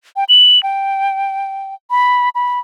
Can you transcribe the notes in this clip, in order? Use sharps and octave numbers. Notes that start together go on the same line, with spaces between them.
G5
F#7
G5
B5
B5